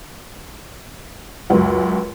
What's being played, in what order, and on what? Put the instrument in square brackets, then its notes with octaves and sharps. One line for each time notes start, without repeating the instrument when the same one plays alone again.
[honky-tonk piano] C#2 F#2